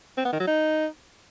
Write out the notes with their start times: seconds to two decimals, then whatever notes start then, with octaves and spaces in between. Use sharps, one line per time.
0.17 C4
0.25 B3
0.32 D#3
0.40 F#3
0.47 D#4